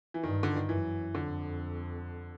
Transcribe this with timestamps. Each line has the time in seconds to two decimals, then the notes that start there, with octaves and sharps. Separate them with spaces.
0.14 E3
0.23 G2 D#3
0.43 D3
0.56 D#3
0.69 F#2 E3
1.15 F2 D3